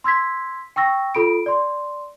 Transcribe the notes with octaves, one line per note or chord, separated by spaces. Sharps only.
C6 E6 G#6 B6
G5 C#6 E6 A#6
F4 A4 B5 D7
D5 C6